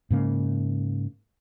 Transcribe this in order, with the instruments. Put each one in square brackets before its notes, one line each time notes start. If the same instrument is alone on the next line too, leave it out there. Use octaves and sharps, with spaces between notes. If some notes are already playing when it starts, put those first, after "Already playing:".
[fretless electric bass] G#2 C#3 A#3